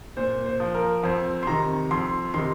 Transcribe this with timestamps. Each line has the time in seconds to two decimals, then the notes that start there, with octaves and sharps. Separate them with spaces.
0.17 A#2 C5
0.46 C5
0.60 F3
0.74 A#4
1.03 F2 C5
1.43 C6
1.47 C3 D#3 A#5
1.91 F2 C6
2.34 C3 D#3 C6